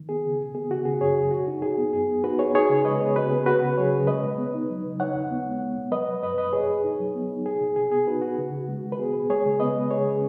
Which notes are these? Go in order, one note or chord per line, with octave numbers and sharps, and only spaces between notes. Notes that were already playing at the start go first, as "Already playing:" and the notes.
Already playing: D#3
B3 G#4
C#3
B2
B3 G#4
C#3 F#4
C#3 G#4
F#2 G#4 C#5
F#2
B2 F#4
D#4
D#4 G#4
B3
F#2 G#4
B3
D#4 F#4 B4
B3 G#4 C#5
D#4 G#4 C#5
C#3
G#3 B4 D#5
B3 G#4 C#5
C#3 F#4 B4
B3 G#4
C#2 F#4 B4
C#3
F#3 G#4 C#5
C#3
G#3 B4 D#5
B2
B3
D#4
F#3
C#3
D#4 C#5 F#5
D#2
B3
G#3
B3
B2
F#3 B4 D#5
B2
F#2 B4 D#5
F#2 B4 D#5
B2 G#4 C#5
B2
D#4
F#3
B3
D#4
B2 G#4
B2
B2 G#4
B3 G#4
D#4 F#4 B4
B3 F#4
C#3
C#3
G#3
D#3
B4
B3 G#4
B2
G#3 G#4 C#5
C#3
B3 B4 D#5
G#3
C#3 G#4 C#5
C#4